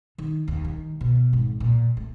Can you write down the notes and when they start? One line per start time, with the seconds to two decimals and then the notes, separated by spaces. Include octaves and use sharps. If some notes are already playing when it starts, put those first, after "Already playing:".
0.18 D#3
0.48 D#2
0.65 D#3
1.01 B2
1.33 G#1
1.60 A#2
1.97 A3